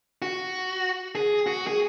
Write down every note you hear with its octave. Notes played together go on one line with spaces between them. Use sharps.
F#4
G#4
F#4
G#4